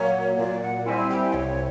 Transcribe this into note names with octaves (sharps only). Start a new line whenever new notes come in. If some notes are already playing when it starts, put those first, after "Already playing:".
Already playing: A#2 F#3 A#3 C#5
A#2 D5
F#5
G3 C4 E4 G#5
G5
C2 C#5